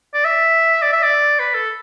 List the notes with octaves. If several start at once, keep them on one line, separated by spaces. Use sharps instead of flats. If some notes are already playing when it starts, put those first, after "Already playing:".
D5
E5
D5
E5
D5
B4
A4